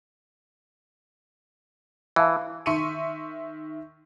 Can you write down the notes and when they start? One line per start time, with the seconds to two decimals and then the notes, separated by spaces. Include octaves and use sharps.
2.16 E3 E5 F5 A5
2.66 D#3 E5 C6 C#6 C#7 D#7